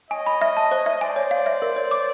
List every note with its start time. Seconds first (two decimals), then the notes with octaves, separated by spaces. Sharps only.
0.10 C#5 D#5 G#5
0.26 B5
0.41 E5
0.57 A5
0.71 C5
0.86 E5
1.01 C5 D5 G#5
1.16 C#5
1.31 F5
1.46 E5
1.62 A#4
1.76 C#5
1.91 D6